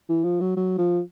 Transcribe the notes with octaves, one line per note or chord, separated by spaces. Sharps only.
E3
F3
F#3
F#3
F3